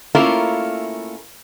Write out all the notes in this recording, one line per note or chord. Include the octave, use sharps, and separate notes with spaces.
A3 A#3 C#4 E4 F4 A#4